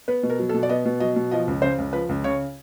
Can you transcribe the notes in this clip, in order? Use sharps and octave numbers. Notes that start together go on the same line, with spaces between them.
B3 B4
B2
A#4
F#3
A4
B2
D5
B3 D#5
B2
F#3 D#5
B2
F3 D#5
C#2
C#3 C5
C#2
F3 B4
C#2
C#3 C#5